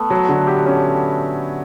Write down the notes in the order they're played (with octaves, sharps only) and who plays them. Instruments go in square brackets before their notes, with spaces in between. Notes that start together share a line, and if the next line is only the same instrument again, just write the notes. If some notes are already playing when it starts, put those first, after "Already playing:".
Already playing: [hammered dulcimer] A3 B3
[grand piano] F#3
D3
G4
C#4